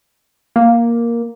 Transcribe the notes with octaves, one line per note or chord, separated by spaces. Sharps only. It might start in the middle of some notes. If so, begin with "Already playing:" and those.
A#3